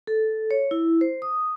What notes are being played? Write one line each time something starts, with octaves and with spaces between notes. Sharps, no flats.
A4
C#5
E4
C5
D#6